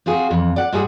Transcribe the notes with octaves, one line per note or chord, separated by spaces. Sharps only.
C4 F4 F#4 G#4
F2 E3
D5 F#5
G#2 G3 G#4 B4 F#5